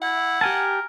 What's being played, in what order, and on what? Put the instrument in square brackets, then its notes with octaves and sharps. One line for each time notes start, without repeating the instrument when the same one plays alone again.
[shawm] E4 [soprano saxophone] F#5
[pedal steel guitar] G4 G#5 A5 [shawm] A#4